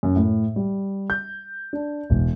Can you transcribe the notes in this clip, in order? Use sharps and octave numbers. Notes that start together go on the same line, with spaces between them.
F#2
A2
G3
G6
D4
E1